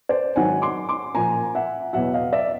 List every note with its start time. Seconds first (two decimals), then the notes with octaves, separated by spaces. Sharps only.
0.09 C5 D5
0.36 G#2 D#3 F#3 F#5 G#5
0.62 C6 D6
0.89 C6 D6
1.15 A#2 F3 G#5 A#5
1.55 E5 F#5
1.93 E2 B2 F#3 E5 F#5
2.14 D#5 F5
2.33 D5 E5